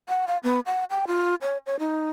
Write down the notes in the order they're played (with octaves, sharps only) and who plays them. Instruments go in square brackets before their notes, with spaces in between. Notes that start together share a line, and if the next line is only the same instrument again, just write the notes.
[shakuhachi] F#5
F5
B3
F#5
G5
F4
C#5
C#5
D#4